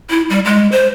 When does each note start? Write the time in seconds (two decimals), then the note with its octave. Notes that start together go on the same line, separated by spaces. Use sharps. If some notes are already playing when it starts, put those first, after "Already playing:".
0.10 E4
0.30 G3
0.45 G#3
0.72 C5